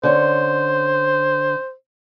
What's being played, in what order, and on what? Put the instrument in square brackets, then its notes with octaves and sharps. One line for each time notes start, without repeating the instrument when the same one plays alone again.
[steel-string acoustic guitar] D3 C#4 [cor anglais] C5